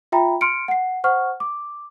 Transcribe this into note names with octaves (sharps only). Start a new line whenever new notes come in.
F4 E5 G5 A#5 B5
C6 F6 C#7 D7
F#5 C7
C5 F#5 C#6 F6
D6